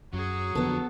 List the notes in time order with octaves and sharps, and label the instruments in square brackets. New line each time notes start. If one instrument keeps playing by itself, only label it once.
[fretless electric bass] F#2 [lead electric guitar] F#3 [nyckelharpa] F#4 G#4
[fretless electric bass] F2 D3 F3 [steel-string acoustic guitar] B3 A4